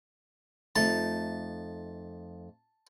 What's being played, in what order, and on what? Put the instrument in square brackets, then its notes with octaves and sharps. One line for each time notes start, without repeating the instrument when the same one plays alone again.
[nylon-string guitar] F2 A3 D#4 [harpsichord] A5